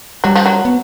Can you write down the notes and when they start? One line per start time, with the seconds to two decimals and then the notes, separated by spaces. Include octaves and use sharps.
0.24 F#3 G3
0.35 F3
0.46 F#3
0.65 B3